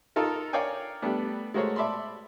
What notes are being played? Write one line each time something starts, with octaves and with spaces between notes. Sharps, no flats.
D#4 F4 A4 A#4
A#4 C#5 D5 F5 G5 G#5
G3 A3 B3 D4
G#3 A3 F#4 A#4 C5 C#5
D5 E5 A5 B5 C6